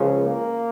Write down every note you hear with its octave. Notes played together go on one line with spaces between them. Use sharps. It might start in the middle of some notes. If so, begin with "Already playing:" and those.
Already playing: C#2 C#3 F3
A#3